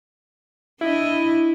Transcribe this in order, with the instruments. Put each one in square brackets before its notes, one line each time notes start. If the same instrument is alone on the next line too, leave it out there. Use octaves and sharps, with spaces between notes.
[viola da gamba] D4 D#5 [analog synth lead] E4